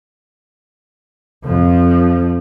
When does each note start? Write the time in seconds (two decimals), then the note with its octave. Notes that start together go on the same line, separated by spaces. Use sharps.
1.45 F2 F3